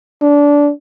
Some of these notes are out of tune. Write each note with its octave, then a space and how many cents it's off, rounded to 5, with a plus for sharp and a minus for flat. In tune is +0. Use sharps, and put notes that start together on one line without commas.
D4 -20